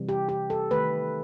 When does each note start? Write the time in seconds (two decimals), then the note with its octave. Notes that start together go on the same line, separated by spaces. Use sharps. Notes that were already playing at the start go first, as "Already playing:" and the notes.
Already playing: C3 E3 G3
0.09 G4
0.29 G4
0.50 A4
0.71 D#3 A3 B4